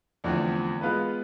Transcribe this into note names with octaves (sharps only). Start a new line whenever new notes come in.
E2 D3 F3 A3 C4
G#3 B3 F4 B4